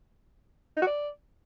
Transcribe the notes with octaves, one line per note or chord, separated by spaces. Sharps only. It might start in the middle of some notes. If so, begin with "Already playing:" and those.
D#4
F#4
D5